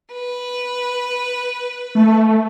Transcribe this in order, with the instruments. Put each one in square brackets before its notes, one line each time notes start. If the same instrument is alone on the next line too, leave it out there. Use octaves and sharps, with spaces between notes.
[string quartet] B4
[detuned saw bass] A3